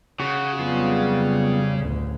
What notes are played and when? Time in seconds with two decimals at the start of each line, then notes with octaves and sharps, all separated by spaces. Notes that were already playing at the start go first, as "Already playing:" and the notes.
0.20 C#3 F#4
0.59 F2 F#3 G3 B3 F4
1.76 A1 D2